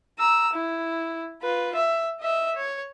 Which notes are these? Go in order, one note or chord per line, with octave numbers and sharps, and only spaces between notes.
A#5 E6
E4
F4 B4
E5
D#5 E5
C#5